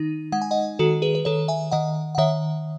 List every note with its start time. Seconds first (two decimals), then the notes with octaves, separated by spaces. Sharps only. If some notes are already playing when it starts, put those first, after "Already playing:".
Already playing: D#3 D#4
0.32 G#3 F#5
0.42 G#5
0.51 D#5 F#5
0.79 D#3 F#4 A4
1.02 G#4 B4
1.15 B4
1.25 D#3 A4 C#5
1.48 E5 G#5
1.71 D#3 D#5 F#5
2.15 F#5
2.18 D#3 C#5 E5